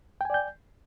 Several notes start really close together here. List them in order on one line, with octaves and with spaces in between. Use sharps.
G5 G#5 D5 G6